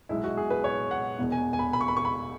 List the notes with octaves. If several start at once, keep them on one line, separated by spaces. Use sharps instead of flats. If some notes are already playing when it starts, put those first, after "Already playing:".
B1 B2 G#3 E4
F#4
G#4
B4
C#5
F#5
E1 E2 B2
G#5
G#5
B5
B5
C#6
B5
C#6
B5